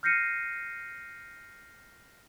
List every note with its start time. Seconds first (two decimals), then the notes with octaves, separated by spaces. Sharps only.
0.03 F6 G6 A#6 C7 C#7 D#7